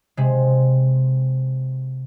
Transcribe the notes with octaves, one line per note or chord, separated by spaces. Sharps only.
C3 G#3